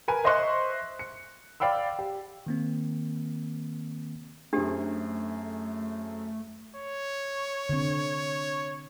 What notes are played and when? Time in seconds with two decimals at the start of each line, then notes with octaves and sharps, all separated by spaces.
0.08 A#4 B4 G#5
0.24 C5 D#5 E5 C6 C#6 F#6
0.99 C#7
1.60 D5 F5 G5 B5 E6
1.99 G4
2.46 D#3 A#3 C4
4.53 F#2 A3 C4 D4 G4 G#4
6.76 C#5
7.69 D3 C4